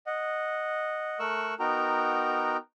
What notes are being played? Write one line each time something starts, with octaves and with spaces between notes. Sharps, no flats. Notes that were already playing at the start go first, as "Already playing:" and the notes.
D#5 F#5
A3 A#4 C#6 E6 F#6
B3 D#4 F#4 A#4 G5 A#5